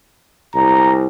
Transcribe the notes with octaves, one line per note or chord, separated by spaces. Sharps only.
C2 A#5